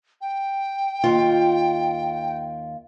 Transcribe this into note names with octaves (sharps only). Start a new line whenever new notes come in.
G5
D#2 F4